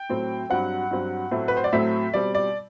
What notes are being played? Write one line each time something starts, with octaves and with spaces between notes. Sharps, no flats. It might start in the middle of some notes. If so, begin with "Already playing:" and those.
Already playing: G5
A2 F#3 C4
G2 F#3 C4 F#5
G2 F#3 C4
A2 F#3 A3 C4
B4
C5
D5
A2 F#3 A3 C4 E5
B2 G3 C4 D5
D5